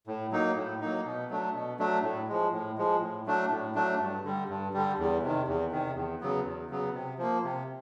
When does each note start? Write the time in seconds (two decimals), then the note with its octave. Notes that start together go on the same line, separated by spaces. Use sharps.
0.07 A2
0.32 F#3 A#3 D#4
0.56 A2
0.81 F#3 A#3 D#4
1.05 B2
1.30 F#3 A3 D4
1.54 B2
1.79 F#3 A3 D4
2.03 A2
2.29 F3 G#3
2.52 A2
2.78 F3 G#3
3.01 A2
3.26 F#3 A3 D4
3.51 A2
3.75 F#3 A3 D4
4.00 G2
4.24 D3 G3
4.49 G2
4.73 D3 G3
4.98 E2
5.22 C3 D#3
5.47 E2
5.72 C3 D#3
5.96 E2
6.21 C#3 F#3 B3
6.45 E2
6.70 C#3 F#3 B3
6.94 C3
7.19 F3 A#3
7.44 C3